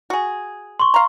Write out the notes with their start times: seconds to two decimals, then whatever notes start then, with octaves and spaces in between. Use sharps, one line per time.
0.10 F#4 G#4
0.80 C6 C#6
0.94 F5 A#5